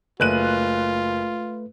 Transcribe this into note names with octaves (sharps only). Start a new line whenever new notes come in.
F#1 A3 F4 B4 F#6 D#7